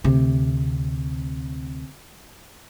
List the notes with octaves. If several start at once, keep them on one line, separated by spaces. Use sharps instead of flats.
D2 C3